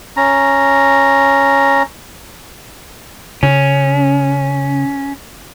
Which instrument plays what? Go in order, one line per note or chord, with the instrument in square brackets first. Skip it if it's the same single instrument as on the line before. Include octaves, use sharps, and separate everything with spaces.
[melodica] C#4 A#5
[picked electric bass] C#3 [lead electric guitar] C#4